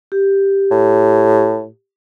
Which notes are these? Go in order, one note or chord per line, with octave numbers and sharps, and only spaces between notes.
G4
A2